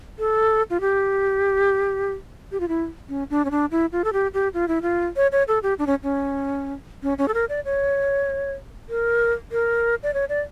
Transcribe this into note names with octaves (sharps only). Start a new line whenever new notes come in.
A4
F4
G4
G4
F4
E4
C#4
D4
C#4
D4
E4
F4
A4
G4
G4
F4
E4
F4
C#5
C#5
A4
G4
D4
C#4
C#4
C#4
C#4
A4
A#4
D5
C#5
A#4
A#4
D5
C#5
D5